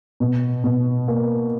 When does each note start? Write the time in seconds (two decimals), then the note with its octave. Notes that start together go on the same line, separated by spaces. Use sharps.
0.20 B2
0.64 B2
1.08 A#3